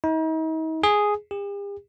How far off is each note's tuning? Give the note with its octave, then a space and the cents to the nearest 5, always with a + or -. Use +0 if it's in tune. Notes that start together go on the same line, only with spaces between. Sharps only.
D#4 +40
G#4 +0
G4 +45